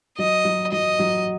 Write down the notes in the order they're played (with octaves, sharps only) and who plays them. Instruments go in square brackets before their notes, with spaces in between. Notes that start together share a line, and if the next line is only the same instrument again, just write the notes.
[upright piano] F#3 [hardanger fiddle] D#5
[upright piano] F#3
[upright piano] F#3 [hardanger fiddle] D#5
[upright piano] F#3